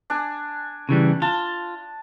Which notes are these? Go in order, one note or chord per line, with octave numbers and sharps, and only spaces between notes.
D4 G#5
C#3 E3 G3
F4 A5